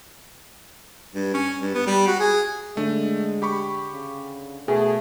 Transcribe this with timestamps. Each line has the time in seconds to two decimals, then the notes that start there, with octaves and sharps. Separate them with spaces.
1.15 G2
1.34 C#4
1.61 G2
1.74 B3
1.86 G3
2.07 F#4
2.20 G#4
2.77 D3 G#3 A3
3.42 G4 B5 C#6
3.94 C#3
4.68 B2 A3 G#4